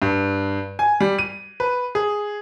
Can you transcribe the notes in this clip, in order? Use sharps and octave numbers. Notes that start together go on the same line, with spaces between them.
G2
G#5
G3
D#7
B4
G#4